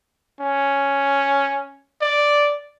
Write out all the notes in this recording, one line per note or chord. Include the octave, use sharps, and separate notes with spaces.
C#4
D5